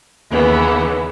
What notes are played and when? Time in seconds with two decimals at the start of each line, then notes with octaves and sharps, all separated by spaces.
0.30 D#2 C#3 E3 B3